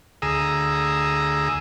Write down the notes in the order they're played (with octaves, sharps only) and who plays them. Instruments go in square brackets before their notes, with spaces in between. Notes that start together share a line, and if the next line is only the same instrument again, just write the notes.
[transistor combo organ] D2 G#4 A#5 D#6 E6